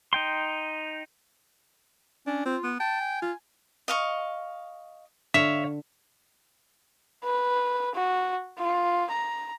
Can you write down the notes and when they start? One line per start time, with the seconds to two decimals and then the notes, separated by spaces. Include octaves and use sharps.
0.13 D#4 G5 C6
2.27 C#4 D4
2.46 C4 F4
2.64 B3
2.80 G5 A5
3.01 G#5
3.22 F4
3.88 D#5 F5 C#6
5.34 D3 C#5 E5 F5
7.24 B4
7.95 F#4
8.58 F4
9.11 A#5